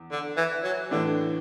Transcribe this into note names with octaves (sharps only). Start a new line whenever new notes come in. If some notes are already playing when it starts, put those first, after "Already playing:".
Already playing: E2
D3
E3
F#3
A2 D3 E3 A3 D4